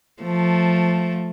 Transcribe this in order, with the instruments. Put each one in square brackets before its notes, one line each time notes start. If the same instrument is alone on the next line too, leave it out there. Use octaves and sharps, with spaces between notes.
[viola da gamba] F3 A3